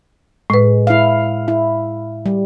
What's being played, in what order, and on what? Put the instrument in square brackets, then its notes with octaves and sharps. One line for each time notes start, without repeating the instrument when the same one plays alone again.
[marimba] A2 B4 [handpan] G#3
[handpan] E4 F5
E4
G3